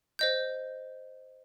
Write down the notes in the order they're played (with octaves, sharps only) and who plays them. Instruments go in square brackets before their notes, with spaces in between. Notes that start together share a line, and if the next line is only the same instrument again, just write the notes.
[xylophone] C5 D#5 G6